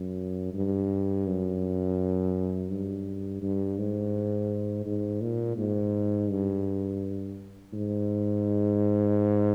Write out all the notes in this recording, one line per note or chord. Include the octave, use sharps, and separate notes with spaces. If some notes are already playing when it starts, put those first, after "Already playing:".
Already playing: F#2
G2
F#2
G2
G2
G#2
G#2
A#2
G#2
G2
G#2